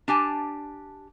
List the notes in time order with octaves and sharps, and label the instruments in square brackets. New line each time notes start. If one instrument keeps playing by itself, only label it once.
[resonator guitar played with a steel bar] D4 G4 G#5 A5